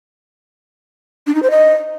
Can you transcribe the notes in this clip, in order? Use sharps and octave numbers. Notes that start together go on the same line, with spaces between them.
D4
D#4
C5
D#5